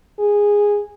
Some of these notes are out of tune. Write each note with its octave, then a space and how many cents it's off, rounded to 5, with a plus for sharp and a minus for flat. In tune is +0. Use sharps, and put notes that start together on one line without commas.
G#4 -10